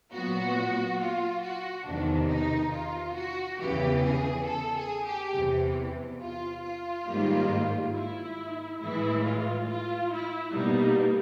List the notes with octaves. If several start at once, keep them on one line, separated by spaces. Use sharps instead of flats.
A#2 F#3 B3 F#4
F4
F#4
E2 C3 D#3 D4
D#4
F4
F#4
E2 C#3 E3 G4
G#4
A4
G#4
G4
E2 C3 E3
F4
F4
G#2 D#3 G3 A#3
E4
A2 E3 G#3 E4
F4
F4
E4
B2 G3 A#3 D#4